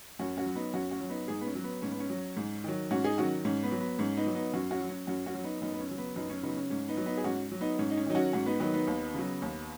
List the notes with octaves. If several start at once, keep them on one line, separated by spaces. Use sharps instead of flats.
F#2 C#4 F#4
C#4 F#4
F#3
B3 D#4
F#2 C#4 F#4
C#4 F#4
F#3
B3 D#4
G#2 D#4 G#4
B3
C#4
F#3
B3
G#2 C#4
B3
C#4
F#3
G#2
D#3 F#3
G#2 C#4 F#4
D#4 G#4
D#3 F#3 C#4 F#4
G#2 C#4
B3
F#3
B3
G#2 C#4
B3 D#4
F#3
B3 D#4
F#2 C#4 F#4
C#4 F#4
F#3
C#4
F#2 C#4 F#4
C#4 F#4
F#3
B3 D#4
F#2 B3 D#4
B3
C#4
C#3 F#3
B3
F#2 B3 D#4
C#4
C#3 F#3 B3 D#4
C#4
G#2 C#4
B3 D#4
F#3
B3 D#4
G#4
G#2 C#4 F#4
F#3
B3 D#4
G#2 C#4
D#4
C#4
D#3 F#3 D#4
C#4 F#4
G#2 C#4 F#4
B3 D#4
D#3 F#3 B3 D#4
B3 D#4
D#2
C#3 F#3
D#2